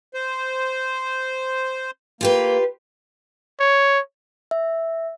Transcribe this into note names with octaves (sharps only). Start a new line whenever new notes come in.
C5
A#3 F4 G4 B4
C#5
E5